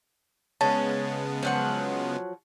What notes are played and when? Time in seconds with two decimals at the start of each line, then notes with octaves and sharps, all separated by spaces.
0.61 C#3 G#3 B3 C#4 A5
1.43 F3 F#3 F#5